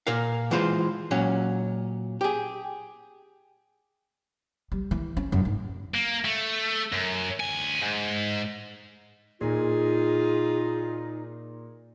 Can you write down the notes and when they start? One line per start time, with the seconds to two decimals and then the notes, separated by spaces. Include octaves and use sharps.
0.07 A#2 A#4 F5
0.51 E3 G#3 F4 C5
1.11 A#2 F#3 C#4
2.21 G4 G#4
4.72 G3
4.91 E3
5.17 C#4
5.32 F#2
5.45 G#2
5.94 A#3
6.25 A3
6.92 F#2
7.40 D2 G#5
7.82 G#2
9.41 A#2 D#4 F4 G#4